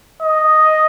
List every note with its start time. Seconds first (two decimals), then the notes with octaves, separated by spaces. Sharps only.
0.22 D#5